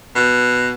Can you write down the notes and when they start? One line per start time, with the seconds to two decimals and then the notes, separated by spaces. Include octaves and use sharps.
0.15 B2